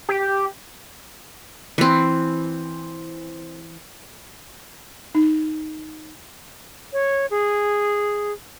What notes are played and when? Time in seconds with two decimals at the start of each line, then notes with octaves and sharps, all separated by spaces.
0.09 G4
1.78 E3 C4
5.15 D#4
6.93 C#5
7.31 G#4